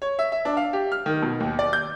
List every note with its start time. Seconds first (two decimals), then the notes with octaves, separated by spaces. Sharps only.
0.02 C#5
0.19 E5
0.32 E5
0.45 D4
0.57 F5
0.73 G4
0.92 F6
1.06 D#3
1.22 B2
1.40 D#2
1.59 D5
1.73 G6